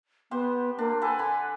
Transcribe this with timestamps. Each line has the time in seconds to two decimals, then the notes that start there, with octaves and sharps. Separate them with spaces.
0.31 B3 G4 C5 F#5
0.79 A#3 D4
1.02 A4 B4 F#5 G#5
1.19 D3 B5